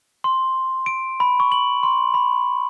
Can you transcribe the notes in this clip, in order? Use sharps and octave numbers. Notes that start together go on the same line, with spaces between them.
C6
D7
B5
C#6
F#7
C6
B5